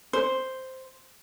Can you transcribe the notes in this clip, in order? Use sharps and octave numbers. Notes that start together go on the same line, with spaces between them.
C5